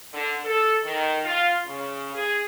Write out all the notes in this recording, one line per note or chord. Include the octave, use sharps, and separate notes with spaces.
D3
A4
D#3
F4
C#3
G#4